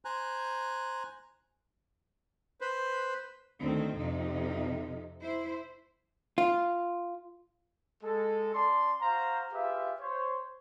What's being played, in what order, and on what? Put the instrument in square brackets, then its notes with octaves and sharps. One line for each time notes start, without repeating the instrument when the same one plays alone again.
[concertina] C5 G#5 A#5 F#6
[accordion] B4 C5
[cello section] D2 D#3 C4
F2 C3 D#4
E4 C5
[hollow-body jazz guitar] F4
[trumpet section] G#3 A4
C#4 D5 A5 C6
F#4 C5 F5 A#5
F4 G4 G#4 B4 E5 F5
C5 C#5